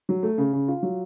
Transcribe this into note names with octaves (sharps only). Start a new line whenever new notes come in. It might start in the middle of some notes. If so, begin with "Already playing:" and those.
F#3
A3
C#3
C#3
F4
F#3